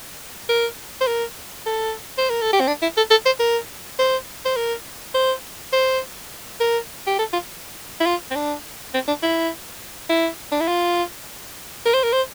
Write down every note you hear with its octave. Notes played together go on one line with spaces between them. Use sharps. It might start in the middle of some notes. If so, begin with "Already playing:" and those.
A#4
C5
A#4
A4
C5
A#4
A4
G4
C4
D4
E4
A4
A4
C5
A#4
C5
C5
A#4
C5
C5
A#4
G4
A4
F4
E4
F4
C4
D4
C4
D4
E4
E4
D4
E4
F4
A#4
C5
A#4
C5